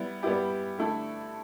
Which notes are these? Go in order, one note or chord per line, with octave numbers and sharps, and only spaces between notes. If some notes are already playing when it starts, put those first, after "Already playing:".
Already playing: G3 B3 E4
G3 B3 E4 G4
D3 A3 E4 A4